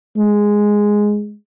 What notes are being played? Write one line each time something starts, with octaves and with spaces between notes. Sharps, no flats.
G#3